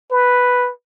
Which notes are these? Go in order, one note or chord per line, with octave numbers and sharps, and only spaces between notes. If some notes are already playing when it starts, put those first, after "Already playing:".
B4